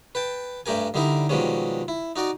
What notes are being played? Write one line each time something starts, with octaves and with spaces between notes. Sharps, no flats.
B4 G5 A5
G2 A3 G4 A#4 G#5
D3 G3 D#4 E4 A#4
B2 D#3 F3 G3 G#3 C#4
E4
D#4 F#4 D5 D#5